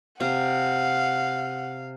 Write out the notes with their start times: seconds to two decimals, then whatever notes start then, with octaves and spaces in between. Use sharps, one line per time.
0.20 C3 F5 F#5